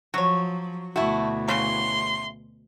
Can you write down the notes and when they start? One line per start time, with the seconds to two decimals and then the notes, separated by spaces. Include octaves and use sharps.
0.14 F3 F#3 F#4 C#5
0.96 D2 B2 A3 E4 F#4
1.48 C#3 E3 F#3 C6